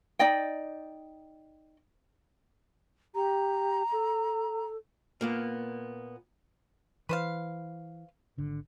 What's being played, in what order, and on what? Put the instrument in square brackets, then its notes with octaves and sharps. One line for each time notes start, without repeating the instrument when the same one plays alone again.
[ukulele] D#4 D5 D#5 G5
[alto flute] G4 [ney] A#5
[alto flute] A4
[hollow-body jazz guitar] A#2 A#3 B3
[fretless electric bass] E3 [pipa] B4 C5 F5
[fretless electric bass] G#1 D3